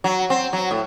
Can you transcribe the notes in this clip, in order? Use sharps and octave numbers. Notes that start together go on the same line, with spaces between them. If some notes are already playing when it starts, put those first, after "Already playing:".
F#3
C4
F#3
A2